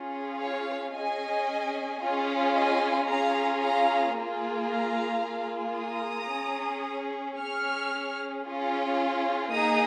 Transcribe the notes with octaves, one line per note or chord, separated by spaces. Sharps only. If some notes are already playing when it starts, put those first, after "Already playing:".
Already playing: C#4 F4 G#4
C#5 F5
C#4 G#4 D#5 G#5
C#4 F4 G#4
D#5 G#5
C#4 F4 G#4 F5 A#5
F5 A#5
A#3 F4 G#4
F5 A#5
A#3 F4 G#4
A#5 D#6
C#4 G#4
C#4 G#4 C#6 F6
C#4 F4 G#4
A#3 D#4 G#4 A#5 D#6